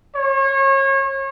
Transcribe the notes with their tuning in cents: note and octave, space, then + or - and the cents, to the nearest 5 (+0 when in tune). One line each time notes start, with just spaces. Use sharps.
C#5 -35